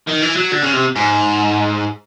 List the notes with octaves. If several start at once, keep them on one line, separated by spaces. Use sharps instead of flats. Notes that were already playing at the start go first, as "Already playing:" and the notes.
D#3
E3
F#3
D3
C#3
C3
G#2